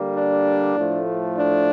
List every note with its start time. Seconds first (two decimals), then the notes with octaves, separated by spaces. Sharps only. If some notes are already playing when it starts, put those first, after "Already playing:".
Already playing: D3 G3 A#3
0.15 D4
0.76 A2 F3 A3
1.37 D4